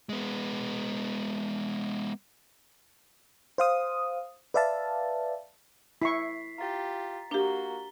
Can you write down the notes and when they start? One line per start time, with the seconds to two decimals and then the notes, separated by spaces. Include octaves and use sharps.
0.09 G#3 B3
3.58 C5 F5 D#6
4.54 B4 D5 E5 F5 A5
6.02 E4 C#6 B6 C7
6.58 F4 G4 A#5 A6
7.31 A#3 D4 F#4 G4 A#5 G7